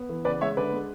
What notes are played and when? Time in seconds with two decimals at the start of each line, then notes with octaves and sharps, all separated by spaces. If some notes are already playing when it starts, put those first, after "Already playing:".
Already playing: B3
0.09 E3
0.25 C#3 B4 D5
0.41 G#3 C#5 E5
0.57 D3 B4 D5
0.73 G#3